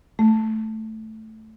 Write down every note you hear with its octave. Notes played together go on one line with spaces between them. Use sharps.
A3